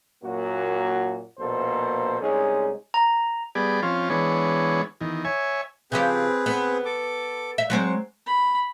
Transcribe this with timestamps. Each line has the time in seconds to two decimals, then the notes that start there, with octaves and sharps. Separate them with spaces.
0.23 F#2 A#2 A#3 F#4
1.39 A#1 B2 A#3 A4 C5
2.21 C2 G#3 C#4 D#4 G#4
2.94 A#5
3.55 G3 B3 G#4 D5
3.82 F3 C4 C#4 F4
4.10 E3 G#3 B3 D4 C#5
5.01 E2 D#3
5.25 C#5 E5 G#5
5.92 C#3 F3 C4 G4 G#4 B4
6.46 B3
6.85 A4 D6
7.58 E5
7.70 F#3 G#3 C4 C#6
8.26 B5